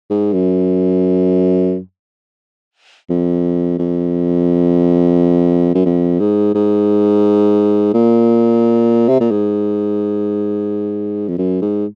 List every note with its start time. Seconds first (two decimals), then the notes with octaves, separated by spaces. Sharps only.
0.10 G#2
0.33 F#2
3.10 F2
3.79 F2
5.75 F#2
5.86 F2
6.20 G#2
6.54 G#2
7.94 A#2
9.09 C3
9.20 A#2
9.31 G#2
11.28 F2
11.38 F#2
11.62 G#2